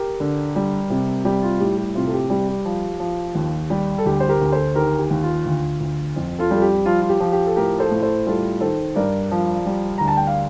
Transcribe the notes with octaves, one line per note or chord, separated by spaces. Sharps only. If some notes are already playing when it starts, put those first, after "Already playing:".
Already playing: G4 A#4
D3
G3
C3
G3 G4
F4
A2 G4
G4
C3 F4
A4
G4
G3 G4
G4
F3
F3
D#2
G3
A4
D2 G4
C5
G4 A#4
D2
A4 C5
D#3 G4 A#4
G4
D#2
F4
D2
D2
F2
F4 A4
G3
A4
G4
F3 F4
F4
G4
F3
G4
A4
A2 G4 A#4
A4 C5
A2
A4 C5
G3 F4 A4
D#3 A4 C5
G2 A#4 D5
F3
G3
D2 A#5
A5
G5
F5